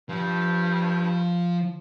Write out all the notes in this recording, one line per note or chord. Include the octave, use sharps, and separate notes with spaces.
G2 F3